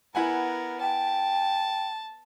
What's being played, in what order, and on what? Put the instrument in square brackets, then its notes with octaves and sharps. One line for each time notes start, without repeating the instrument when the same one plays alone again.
[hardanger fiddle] B3 A#4 [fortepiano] E4 F#5 G#5
[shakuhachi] G5 [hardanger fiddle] A5